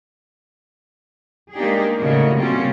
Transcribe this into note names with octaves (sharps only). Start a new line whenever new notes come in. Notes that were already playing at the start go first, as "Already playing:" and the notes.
G#3 A#3 D4 D#4 G4 G#4
A2 C#3 A3 F#4 A#4 D#5
C3 G3 A#3 C#4 F4 F#4